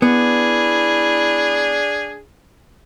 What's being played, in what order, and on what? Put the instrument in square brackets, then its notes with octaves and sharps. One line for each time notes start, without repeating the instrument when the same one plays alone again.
[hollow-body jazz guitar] B3 [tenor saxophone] D4 [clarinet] E4 [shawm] G#4